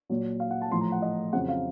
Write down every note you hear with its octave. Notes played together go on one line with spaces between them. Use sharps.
A#2 F#3
F5
F#5
A5
A2 F3 C6
A#5
F#5
D#5
F2 C#3 F#3 F#5
F5